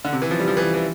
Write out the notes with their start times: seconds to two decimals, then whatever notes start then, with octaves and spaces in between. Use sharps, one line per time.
0.05 D3
0.13 C3
0.22 E3
0.31 F3
0.40 G3
0.48 F3
0.57 E3
0.74 E3